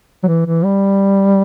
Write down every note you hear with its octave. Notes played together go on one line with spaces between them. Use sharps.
F#3
E3
E3
G3